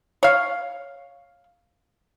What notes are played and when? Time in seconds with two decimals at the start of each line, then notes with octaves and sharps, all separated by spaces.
0.23 C#5 F5